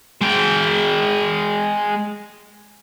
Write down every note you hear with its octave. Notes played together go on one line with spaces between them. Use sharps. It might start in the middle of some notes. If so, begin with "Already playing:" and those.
G#3 G5